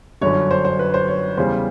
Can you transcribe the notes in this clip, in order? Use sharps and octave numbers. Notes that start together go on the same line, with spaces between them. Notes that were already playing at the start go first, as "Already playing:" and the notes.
G1 F#2 D3 C#5
C5
C5
B4
C5
C#5
E2 C#3 E3 G3 C5